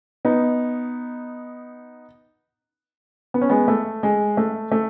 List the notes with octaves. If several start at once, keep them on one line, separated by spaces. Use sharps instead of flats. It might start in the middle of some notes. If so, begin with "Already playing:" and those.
B3 D#4
B3
C#4
G#3 B3
A3
G#3
A3
A3